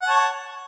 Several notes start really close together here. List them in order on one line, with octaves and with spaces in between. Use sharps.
F#5 A5 C#5